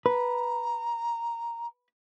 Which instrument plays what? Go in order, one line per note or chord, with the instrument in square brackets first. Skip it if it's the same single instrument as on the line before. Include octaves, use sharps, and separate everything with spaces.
[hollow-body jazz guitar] B4 [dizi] A#5